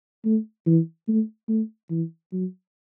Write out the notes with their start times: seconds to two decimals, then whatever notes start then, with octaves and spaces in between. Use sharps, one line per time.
0.25 A3
0.66 E3
1.08 A3
1.49 A3
1.90 E3
2.33 F#3